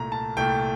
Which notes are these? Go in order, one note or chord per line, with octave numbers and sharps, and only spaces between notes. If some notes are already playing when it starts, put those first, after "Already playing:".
Already playing: C2 A#2 A3 A#5
A5
C2 A#2 A3 G5